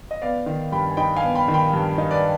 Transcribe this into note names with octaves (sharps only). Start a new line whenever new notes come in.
D#5
B3 D5 F5
D#3
G2 G5 B5
G#5
D#4 G5 B5
F5 G#5
B3
G5 B5
D#3
G5 B5
G2
D#4
B4 D5